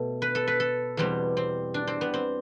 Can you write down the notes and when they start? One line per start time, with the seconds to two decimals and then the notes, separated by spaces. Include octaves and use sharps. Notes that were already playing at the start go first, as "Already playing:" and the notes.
Already playing: B2 A3
0.22 B4
0.35 A4
0.47 B4
0.60 A4
0.97 E2 B2 G3 C4
1.37 C4
1.74 D4
1.87 C4
2.01 B3
2.14 C4